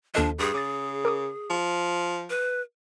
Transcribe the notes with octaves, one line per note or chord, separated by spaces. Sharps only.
D#2 F3 D4 A4 D#5
G2 G#4
C#3 D6 D#6 A6
A#4 D6 D#6
F3
B4